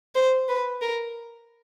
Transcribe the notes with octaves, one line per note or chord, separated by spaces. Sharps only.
C5
B4
A#4